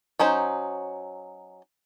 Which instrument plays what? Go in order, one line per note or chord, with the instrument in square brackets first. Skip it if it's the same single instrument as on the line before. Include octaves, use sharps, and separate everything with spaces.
[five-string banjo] F#3 C#4 D#4 C5